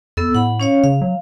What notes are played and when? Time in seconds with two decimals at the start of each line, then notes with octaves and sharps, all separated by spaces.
0.17 F2 B3 A4 E6
0.35 A2 F#5 B5
0.60 C#4 C#5 F5
0.84 C#3 F5
1.01 F#3